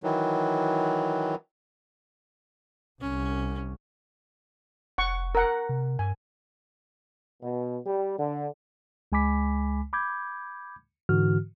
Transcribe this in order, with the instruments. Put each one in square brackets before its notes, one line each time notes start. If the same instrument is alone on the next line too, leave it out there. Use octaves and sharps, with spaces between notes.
[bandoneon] D#3 E3 F#3
[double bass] C2 [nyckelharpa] C#4
[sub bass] F1 [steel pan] F#5 C#6
[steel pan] A#4 F#5
[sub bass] C3
[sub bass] G2 [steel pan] G#5
[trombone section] B2
G3
D3
[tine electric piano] C#2 G#3 G#5 B5 D6 B6
B5 D6 G6 G#6
G#2 D3 E3 F#4 F6